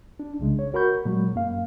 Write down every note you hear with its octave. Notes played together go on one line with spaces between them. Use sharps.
D4
C2 C#3 G#3
C#5
F#4 A#4 F#5 B5 C#6 G6
A#2 F#3 G#3
F#2 A#3 F5